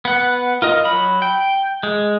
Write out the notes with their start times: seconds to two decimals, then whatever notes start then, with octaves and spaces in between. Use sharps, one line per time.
0.05 B3 F#5
0.62 F4 A#4 D#5
0.85 F#3 B5
1.22 G5
1.83 G#3